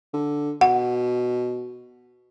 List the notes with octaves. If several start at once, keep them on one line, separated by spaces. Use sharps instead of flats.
D3
B2 F#5